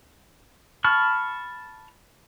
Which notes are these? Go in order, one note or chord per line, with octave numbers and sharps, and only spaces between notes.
A5 B5 C#6 F6